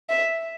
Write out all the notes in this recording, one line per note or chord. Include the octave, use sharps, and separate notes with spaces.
E5